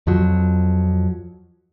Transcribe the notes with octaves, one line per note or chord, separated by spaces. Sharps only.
F2 F3 F#3